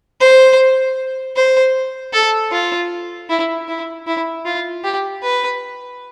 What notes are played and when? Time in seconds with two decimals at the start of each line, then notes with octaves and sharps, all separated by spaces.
0.21 C5
1.36 C5
2.13 A4
2.52 F4
3.29 E4
3.68 E4
4.07 E4
4.45 F4
4.84 G4
5.23 B4